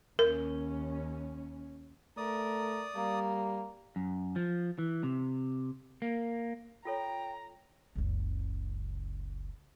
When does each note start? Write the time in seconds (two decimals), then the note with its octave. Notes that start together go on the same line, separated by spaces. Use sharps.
0.19 D#2 C#4 A#4
2.17 A3 A#4 D5 D#6
2.95 G3 A#3
3.96 F#2
4.36 F3
4.79 E3
5.03 C3
6.02 A#3
6.85 F4 A4 C#5 G5 A#5
7.95 F#1 C#2